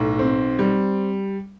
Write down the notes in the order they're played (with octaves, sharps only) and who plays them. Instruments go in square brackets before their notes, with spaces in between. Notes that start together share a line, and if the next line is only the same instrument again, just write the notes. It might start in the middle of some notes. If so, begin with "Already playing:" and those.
Already playing: [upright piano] B1 A2
C4
G3